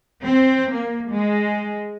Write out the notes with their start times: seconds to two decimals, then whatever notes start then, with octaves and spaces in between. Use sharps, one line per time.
0.25 C4
0.73 A#3
1.10 G#3